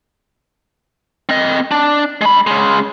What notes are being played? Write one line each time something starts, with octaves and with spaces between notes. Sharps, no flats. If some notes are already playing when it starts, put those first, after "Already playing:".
C4 D#5
D4
G#3 B5
C#3 G#3